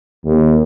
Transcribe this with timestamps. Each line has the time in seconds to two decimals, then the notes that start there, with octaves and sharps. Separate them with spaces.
0.25 D#2